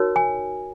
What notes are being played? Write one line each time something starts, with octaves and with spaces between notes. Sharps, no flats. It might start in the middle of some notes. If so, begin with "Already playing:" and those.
Already playing: D#4 F#4 A#4 C#5
G#5